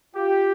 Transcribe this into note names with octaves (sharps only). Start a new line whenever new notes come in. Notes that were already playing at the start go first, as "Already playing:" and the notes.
F4 G4